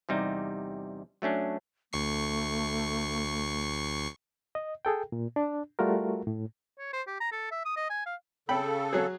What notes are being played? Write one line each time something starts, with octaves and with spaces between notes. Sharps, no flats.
E2 C3 G3 D#4
F#3 A3 C#4 D4
D2 A3 C#6 C7
D#5
G#4 A4 G5
A#2
D4
G3 A3 F4 F#4 A#4
A2
C#5
C5
G4
A#5
A4
E5
D#6
D#5
G#5
F5
C#3 A4 G5 B5
F#3 G#4